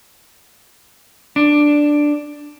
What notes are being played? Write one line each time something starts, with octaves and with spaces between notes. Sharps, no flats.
D4